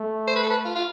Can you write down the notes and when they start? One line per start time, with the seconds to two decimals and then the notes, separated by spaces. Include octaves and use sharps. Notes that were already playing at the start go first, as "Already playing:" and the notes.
Already playing: A3
0.27 C5
0.35 B4
0.43 A4
0.50 B4
0.65 F4
0.75 F4